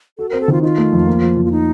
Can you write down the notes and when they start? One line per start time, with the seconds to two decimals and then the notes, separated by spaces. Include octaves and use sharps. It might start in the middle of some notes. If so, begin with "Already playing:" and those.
0.18 F#4 A4
0.29 C4 A#4
0.41 A4
0.48 D#3 F4
0.63 D#4 F4
0.78 A3
0.93 F2
1.07 A#3
1.22 F3
1.37 F2
1.45 F4
1.51 D#4